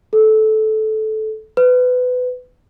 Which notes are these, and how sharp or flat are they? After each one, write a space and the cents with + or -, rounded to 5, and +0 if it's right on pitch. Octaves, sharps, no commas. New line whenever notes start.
A4 -15
B4 +20